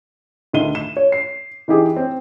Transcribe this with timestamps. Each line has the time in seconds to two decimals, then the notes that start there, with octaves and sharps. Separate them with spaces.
0.53 D2 D#3 D#5 D#7 G7
0.75 E7
0.97 C#5
1.12 C7
1.68 E3 D#4 E4 G4 G#4
1.96 C4